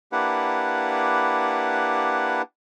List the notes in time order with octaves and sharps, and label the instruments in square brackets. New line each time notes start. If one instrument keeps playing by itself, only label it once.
[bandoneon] A#3 D4 E4 G4 B4 F#5